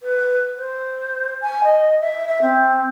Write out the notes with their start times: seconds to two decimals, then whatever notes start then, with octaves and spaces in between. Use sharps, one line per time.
0.01 B4
0.56 C5
1.41 G#5
1.64 D#5
2.00 E5
2.27 E5
2.41 C4